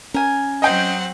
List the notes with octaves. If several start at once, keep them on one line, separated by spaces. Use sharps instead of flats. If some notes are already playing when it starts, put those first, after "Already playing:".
C#4 A#4 G#5
F#3 C4 D#5 F#5 G5 G6